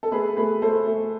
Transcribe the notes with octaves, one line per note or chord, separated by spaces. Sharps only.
A4
A3 G#4 B4
A3 G#4 B4
A3 A4 C5
A3